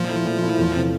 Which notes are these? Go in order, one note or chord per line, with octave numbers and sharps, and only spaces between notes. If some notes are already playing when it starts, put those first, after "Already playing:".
Already playing: A#2 F3
A3 E4
A#2
A3 E4
E2
C3 E3 A3